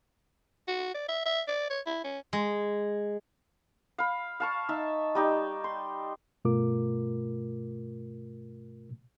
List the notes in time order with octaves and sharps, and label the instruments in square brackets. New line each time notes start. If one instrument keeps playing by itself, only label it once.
[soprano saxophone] F#4
D5
E5
E5
D5
C#5
E4
C#4
[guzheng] G#3
[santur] F5 B5
F5 A5 C#6
D#4 E5 A5
G3 D#4 G4
C6
[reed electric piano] G2 B2 A3 F4 A#4 D6